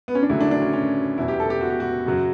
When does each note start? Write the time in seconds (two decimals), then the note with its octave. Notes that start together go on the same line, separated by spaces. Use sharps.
0.08 B3
0.15 C#4
0.22 D4
0.29 D2 C#3 F#3 E4
0.41 D4
0.51 D4
0.61 C#4
0.73 C#4
1.18 E2 B2 F#3 E4
1.28 G4
1.40 A4
1.50 G4
1.61 F#4
1.70 G4
1.80 F#4
2.06 F#2 C#3 F#3